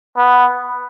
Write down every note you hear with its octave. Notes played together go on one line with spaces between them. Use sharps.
B3